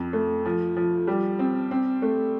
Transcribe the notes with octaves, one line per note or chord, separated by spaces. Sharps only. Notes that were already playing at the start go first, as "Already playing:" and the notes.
Already playing: F2
A3
F3
F3
G3
C4
C4
A3